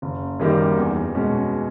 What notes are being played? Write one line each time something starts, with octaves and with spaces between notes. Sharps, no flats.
F#1
F#2 D#3 G3 A#3
E2
B2 G#3 C#4